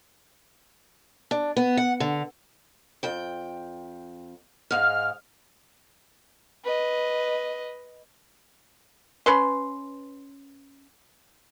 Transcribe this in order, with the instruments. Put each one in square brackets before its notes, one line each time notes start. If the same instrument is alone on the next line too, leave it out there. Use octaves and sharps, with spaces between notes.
[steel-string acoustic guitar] D4
B3
F#5
D3
F2 G5
[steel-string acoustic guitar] G#2 G#3 F5 [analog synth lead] F6
[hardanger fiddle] B4 D#5
[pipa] C#4 B4 C6